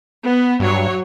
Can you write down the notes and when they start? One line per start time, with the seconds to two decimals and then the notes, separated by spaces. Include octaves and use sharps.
0.21 B3
0.60 G2 F#3 C#5